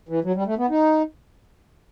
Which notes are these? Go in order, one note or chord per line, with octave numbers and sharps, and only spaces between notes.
E3
F#3
G3
A3
B3
D#4